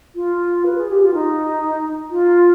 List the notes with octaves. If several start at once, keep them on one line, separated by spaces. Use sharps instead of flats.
F4
B4
G#4
G4
F4
D#4
F4